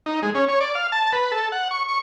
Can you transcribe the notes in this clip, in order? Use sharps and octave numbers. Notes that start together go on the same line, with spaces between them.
D#4
G#3
C#4
C#5
D5
F5
A5
B4
A4
F#5
C#6
C#6